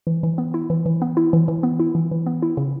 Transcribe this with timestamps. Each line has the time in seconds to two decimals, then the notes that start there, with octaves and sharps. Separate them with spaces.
0.07 E3
0.23 E3
0.38 B3
0.54 E4
0.70 E3
0.86 E3
1.02 B3
1.17 E4
1.33 E3
1.48 E3
1.63 B3
1.80 E4
1.95 E3
2.11 E3
2.26 B3
2.42 E4
2.57 C#3